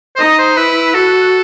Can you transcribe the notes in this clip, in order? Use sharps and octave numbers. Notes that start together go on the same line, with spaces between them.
C5
D#4 D#5
C5
E4 B4
F#4 A4